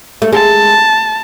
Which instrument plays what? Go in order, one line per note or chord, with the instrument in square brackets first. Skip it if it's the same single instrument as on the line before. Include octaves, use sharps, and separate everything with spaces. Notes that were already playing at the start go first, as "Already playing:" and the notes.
[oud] A3
[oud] G#3 [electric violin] A5